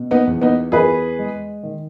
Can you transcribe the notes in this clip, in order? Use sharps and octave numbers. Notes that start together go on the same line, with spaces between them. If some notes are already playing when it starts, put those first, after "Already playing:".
Already playing: B2
B3 D#4
E2
B3 D#4
E2 G#4 B4
G#3
D#3